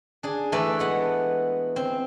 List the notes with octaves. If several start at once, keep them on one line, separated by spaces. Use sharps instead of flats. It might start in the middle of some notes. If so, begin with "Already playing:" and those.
D4 G#4
E3 A3 A4 B4 D5
G#3 B3 F#5
C4